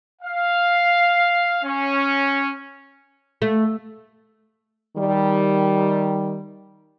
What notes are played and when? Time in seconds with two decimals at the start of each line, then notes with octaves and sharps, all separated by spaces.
0.22 F5
1.63 C#4
3.42 A3
4.96 D#3 G3